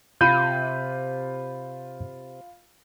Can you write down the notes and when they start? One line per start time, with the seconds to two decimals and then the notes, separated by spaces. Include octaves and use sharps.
0.21 C3 F4 B5 G6 D#7